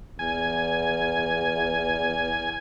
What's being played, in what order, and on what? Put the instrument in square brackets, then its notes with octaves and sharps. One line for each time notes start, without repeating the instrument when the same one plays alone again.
[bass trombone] E2 [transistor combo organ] G#5